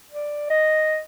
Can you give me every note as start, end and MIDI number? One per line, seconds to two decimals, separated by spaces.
0.11 0.50 74
0.50 1.01 75